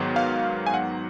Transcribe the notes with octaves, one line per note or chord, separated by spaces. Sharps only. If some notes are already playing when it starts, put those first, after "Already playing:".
Already playing: G#2 D#3 F#3 B3
F5
G#5
F#5